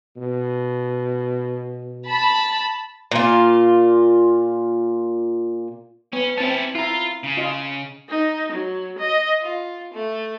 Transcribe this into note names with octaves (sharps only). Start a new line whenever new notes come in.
B2
A5 B5
A#2 F4
B3 C#4
C4 C#4 E4 A5
E4 F4 A#5
C#3
F4 D#5
D#4
F#3
D#5
F4
A3